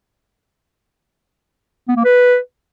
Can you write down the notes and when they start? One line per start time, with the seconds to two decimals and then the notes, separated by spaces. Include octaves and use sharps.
1.88 B3
1.97 A#3
2.05 B4